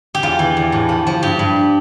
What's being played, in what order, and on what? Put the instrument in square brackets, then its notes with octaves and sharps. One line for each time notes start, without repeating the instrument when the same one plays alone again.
[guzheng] G4
E2 F4
E3
E2
A2
F3
F3
G2 G4
G2